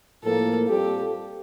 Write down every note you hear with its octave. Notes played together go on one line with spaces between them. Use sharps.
A2 F3 A#3 A4
G3 C4 F4 G4 A4